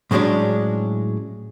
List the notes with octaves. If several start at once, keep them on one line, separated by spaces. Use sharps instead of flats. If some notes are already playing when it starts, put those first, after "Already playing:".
A2 F#3 G#3 C#4 D4